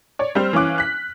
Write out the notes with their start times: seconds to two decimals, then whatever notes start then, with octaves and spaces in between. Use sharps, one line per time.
0.19 C#5 D5
0.35 G3 C4 C5 F6
0.53 E3 C#4 F5 D6 F#6
0.78 F#6 B6